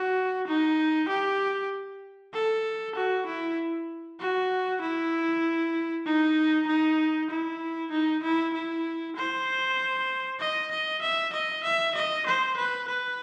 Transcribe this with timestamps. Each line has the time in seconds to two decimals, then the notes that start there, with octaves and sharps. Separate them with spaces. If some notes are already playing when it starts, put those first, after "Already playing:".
Already playing: F#4
0.47 D#4
1.09 G4
2.33 A4
2.95 F#4
3.26 E4
4.20 F#4
4.81 E4
6.06 D#4
6.67 D#4
7.30 E4
7.91 D#4
8.23 E4
8.54 E4
9.16 C5
10.40 D#5
10.71 D#5
11.02 E5
11.33 D#5
11.64 E5
11.95 D#5
12.26 C5
12.57 B4
12.88 B4